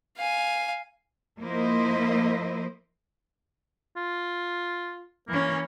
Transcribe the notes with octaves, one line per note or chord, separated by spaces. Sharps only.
F5 G#5
F3 A#3 E4 A#4 C5 D#5
F4
E3 A#3 C#4